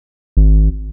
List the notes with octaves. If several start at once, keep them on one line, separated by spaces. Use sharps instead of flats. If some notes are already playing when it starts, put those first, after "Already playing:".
G#1